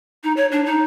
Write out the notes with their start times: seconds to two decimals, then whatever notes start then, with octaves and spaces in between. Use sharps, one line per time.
0.24 D#4
0.37 C#5
0.52 D4
0.66 D#4